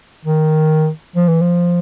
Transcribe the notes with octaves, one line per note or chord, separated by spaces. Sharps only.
D#3
F3
E3
F3